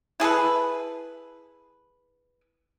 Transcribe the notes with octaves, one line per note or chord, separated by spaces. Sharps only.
E4 G#4 A4 B4